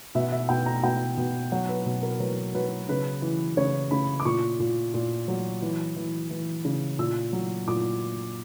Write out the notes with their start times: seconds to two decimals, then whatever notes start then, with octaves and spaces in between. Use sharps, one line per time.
0.15 B2 E5
0.32 E5
0.49 B2 G5
0.66 A#5
0.83 B2 G5
1.17 B2
1.52 F#3 F#5
1.69 B4
1.86 B2
2.02 A#4
2.20 F#3 B4
2.54 F#3 B4
2.89 C#3 B4
3.22 E3
3.57 C#3 C#5
3.91 C#3 B5
4.20 D6
4.25 A#2 C#6
4.59 A#2
4.94 A#2
5.28 F#3
5.62 E3
5.96 E3
6.30 E3
6.65 C#3
6.99 A#2 E6
7.33 F#3
7.68 A#2 D6